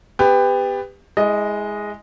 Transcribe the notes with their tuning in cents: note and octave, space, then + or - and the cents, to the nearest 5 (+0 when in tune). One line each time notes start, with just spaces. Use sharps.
B3 +20 G4 +25
G#3 +0 E4 -30 D#5 +0